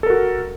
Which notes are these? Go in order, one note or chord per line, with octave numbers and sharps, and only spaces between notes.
F#4 A4 A#4